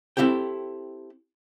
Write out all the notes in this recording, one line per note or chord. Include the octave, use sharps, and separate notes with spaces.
C4 E4 G4 A4 G5